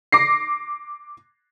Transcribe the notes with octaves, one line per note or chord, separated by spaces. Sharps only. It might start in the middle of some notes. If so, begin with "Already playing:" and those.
D6 A#6 C7